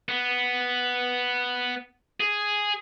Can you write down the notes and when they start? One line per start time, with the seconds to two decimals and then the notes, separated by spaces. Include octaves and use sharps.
0.09 B3
2.20 G#4